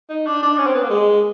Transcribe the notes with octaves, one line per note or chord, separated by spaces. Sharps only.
D#4
D4
D4
C#4
C4
B3
A#3
G#3